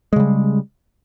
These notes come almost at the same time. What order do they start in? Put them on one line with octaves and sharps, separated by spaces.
G#3 C#3 G3